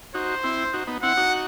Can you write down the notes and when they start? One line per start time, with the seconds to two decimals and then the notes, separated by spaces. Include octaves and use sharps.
0.14 D#4 F#4 C5
0.44 C4 E4
0.74 D#4 F#4
0.87 B3 D#4
1.02 C4 E4 F#5
1.17 D#4 F#4